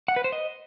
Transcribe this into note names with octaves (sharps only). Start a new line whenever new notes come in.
F#5
B4
C5
D#5